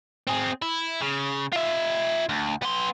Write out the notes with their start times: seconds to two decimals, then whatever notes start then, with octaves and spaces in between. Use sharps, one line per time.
0.27 C4 G#4
0.62 E4
1.02 C#3
1.52 F4 E5
2.29 D2
2.62 B3 C6